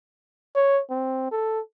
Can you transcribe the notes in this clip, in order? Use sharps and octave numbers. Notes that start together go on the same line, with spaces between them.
C#5
C4
A4